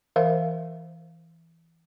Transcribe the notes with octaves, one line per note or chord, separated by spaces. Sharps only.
E3 A#4 C5 E5 F5